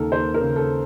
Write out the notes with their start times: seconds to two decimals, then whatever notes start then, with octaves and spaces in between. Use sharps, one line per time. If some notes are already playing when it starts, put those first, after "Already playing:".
Already playing: D#2 C#3 A4 A#4
0.12 D#2 C5
0.34 A#4
0.41 C#3
0.56 A4